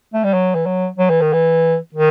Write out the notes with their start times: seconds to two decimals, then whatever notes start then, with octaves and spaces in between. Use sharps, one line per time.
0.14 A3
0.24 G3
0.33 F#3
0.55 E3
0.66 F#3
0.98 F#3
1.10 E3
1.21 D#3
1.33 E3
1.94 D#3